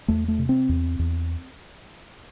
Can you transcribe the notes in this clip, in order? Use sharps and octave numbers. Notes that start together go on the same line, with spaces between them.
E2 A3
A3
C3
C4
E2
E2